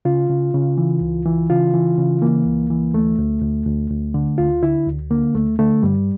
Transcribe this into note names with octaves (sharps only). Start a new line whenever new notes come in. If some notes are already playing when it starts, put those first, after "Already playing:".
C#3 F4
C#3
C#3
E3
C#2
E3
C#3 F4
E3
C#3
E3 A#3
C#2
E3
D2 A3
D2
D2
D2
D2
D3
D2 F4
D3 E4
D2
D3 A#3
D2 A3
D3 A3
G2 G3